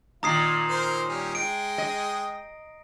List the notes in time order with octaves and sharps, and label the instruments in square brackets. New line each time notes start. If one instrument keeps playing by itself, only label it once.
[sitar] A#2 D#3 [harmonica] F4 [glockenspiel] A#5 D#6 C7
[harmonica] A#4 C5
G3 C#4
[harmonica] G#3 G5 D#6 [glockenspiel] D7
[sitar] D#5